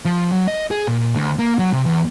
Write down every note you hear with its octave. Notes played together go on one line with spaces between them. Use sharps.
F3
F#3
D#5
G#4
A#2
D2
A#3
F#3
C3
E2